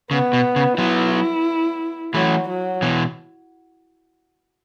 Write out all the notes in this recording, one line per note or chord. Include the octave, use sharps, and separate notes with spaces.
C#3 B3
B2
C#3
F#3 B3 E4
E3 F#3 A3
F#3
B2 E3